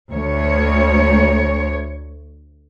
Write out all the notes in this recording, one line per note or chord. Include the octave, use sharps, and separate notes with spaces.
D2 C#5